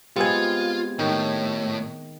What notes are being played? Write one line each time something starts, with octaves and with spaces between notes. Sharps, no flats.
G#3 B3 C4 F4 G4 G#6
A2 D#3